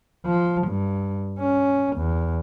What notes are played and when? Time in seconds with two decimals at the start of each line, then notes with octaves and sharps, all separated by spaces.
0.26 F3
0.68 G2
1.39 C#4
1.97 E2